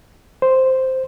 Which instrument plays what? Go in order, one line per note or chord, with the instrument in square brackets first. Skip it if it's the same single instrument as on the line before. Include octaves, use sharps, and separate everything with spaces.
[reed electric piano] C5